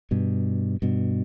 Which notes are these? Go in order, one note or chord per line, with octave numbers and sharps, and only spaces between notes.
G2 B2
G2 B2